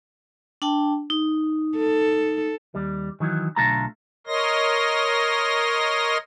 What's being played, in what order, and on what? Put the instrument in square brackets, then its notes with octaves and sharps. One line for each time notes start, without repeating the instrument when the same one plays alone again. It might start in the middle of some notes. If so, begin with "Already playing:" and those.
[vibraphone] D4 G5 A5
D#4
[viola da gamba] A4
[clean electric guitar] D#2 G3
D#3 E3 F#3
B1 D3 A3 F4 A5 A#5
[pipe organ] A#4 C#5 D#5 C6 A#6